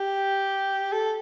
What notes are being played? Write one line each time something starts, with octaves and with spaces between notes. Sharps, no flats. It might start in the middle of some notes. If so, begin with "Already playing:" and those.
Already playing: G4
A4